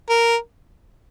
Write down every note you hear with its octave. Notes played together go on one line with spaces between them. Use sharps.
A#4